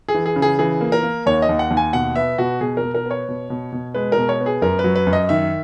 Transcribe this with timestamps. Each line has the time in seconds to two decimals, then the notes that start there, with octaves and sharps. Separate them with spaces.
0.08 G#4
0.14 E3
0.26 G#4
0.36 C#3
0.42 G#4
0.59 E3 G#4
0.81 A#3
0.92 A#4
1.03 A#3
1.26 D#2 C#5
1.42 D#5
1.49 D#2
1.59 F#5
1.70 D#2
1.77 G#5
1.93 B2 F#5
2.16 B3 E5
2.38 B2 F#4
2.61 B2 G#4
2.77 A#4
2.83 B2
2.95 A#4
3.06 B3
3.11 C#5
3.28 B2
3.50 B2
3.72 B2
3.94 G#3 B4
4.12 A#4
4.18 B2
4.29 C#5
4.41 B3
4.46 G#4
4.62 F#2 A#4
4.79 B4
4.84 F#3
4.96 B4
5.07 F#2
5.13 D#5
5.29 D#3 E5